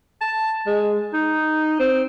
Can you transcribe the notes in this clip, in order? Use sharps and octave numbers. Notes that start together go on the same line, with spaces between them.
A5
G#3
D#4
C4